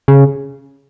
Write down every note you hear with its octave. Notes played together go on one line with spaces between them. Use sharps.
C#3